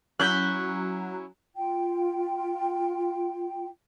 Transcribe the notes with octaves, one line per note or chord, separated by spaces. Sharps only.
F#3 C#4 E4 F#6 G6 B6
F4 G5